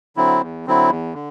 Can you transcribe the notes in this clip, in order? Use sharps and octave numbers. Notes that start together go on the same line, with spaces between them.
D3 F#3 C4 E4
E2
D3 F#3 C4 E4
E2
D3